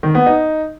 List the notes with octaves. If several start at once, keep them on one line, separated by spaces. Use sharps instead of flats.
D#3
B3
D#4